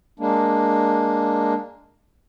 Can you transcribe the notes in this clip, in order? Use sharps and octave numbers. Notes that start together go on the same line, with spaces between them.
G#3 A#3 D4